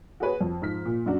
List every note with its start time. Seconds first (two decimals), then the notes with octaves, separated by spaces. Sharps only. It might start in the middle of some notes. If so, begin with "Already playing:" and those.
0.20 F#4 G#4 B4 C#5
0.41 F2
0.62 G#2 F3 F6 B6
0.85 A#2
1.06 F#2 F#3 D4 F#4